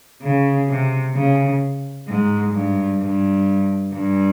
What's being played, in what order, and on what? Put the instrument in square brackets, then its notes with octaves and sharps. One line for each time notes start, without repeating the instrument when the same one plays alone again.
[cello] C#3
C3
C#3
G#2
G2
G2
G2